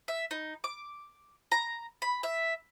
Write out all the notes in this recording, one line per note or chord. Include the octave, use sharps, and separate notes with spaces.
E5
D#4
D6
A#5
B5
E5